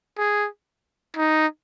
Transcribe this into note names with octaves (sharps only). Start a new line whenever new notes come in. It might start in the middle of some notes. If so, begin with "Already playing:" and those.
G#4
D#4